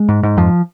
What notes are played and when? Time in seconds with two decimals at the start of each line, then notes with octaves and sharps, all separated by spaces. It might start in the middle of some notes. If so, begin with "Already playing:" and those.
Already playing: G#3
0.09 G#2
0.23 G#2
0.37 F2 F3